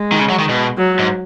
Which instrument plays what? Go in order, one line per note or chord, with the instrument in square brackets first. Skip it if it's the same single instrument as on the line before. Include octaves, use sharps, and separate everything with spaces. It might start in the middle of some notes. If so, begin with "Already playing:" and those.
Already playing: [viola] G#3
[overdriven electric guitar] D#3
C#3
F#3
D#3
B2
[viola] F#3
[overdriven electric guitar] G#2